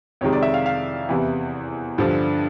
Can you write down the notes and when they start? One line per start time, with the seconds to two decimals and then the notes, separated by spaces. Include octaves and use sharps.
0.21 F2 C3 D#3 G#3 C#5
0.33 D5
0.43 E5
0.54 F5
0.66 F5
1.09 E2 C3 E3
1.98 G2 D3 F3